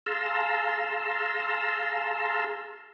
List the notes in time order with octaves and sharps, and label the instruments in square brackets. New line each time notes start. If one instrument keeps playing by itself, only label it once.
[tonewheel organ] G#4 F5 A5 A#5 C6 E6